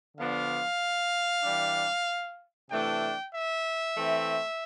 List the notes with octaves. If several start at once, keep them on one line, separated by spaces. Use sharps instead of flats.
D3 F3 B3 D4 F5
E3 G3 D4
C3 E3 A3 D4 G5
E5
E3 A3 C4